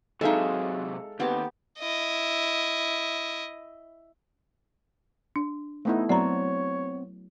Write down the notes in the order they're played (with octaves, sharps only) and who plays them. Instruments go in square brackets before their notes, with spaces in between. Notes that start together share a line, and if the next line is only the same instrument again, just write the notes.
[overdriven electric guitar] C3 F#3 [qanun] G#3 [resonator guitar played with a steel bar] D#4 E5 A5 [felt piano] A4 F5
[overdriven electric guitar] D#2 [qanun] B3 G4 A5 [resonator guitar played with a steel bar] C4
[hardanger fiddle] E4 D#5
[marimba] D4
[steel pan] A3 B3 E4 [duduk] D#4
[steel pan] F#3 [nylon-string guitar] B3 C4 [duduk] C#5 [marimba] D5 A#5